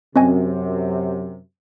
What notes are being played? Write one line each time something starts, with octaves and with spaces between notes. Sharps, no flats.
F#2 C3 C4 D#5 G#5